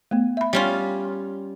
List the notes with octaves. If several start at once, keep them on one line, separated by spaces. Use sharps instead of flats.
A3 B3
E5 B5
G3 C#4 F4